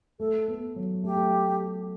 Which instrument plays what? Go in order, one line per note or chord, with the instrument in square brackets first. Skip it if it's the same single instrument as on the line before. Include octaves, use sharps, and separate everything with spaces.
[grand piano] A3 [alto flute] A4
[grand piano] B3
F#3
[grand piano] A3 [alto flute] G4
[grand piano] A3